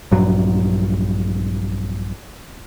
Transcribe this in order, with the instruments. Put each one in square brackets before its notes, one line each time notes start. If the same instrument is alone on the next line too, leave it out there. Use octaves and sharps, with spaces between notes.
[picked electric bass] A#1 G2 F#3